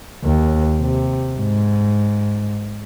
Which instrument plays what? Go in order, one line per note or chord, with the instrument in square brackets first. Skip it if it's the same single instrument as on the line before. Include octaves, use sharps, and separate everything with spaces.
[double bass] D#2
C3
G#2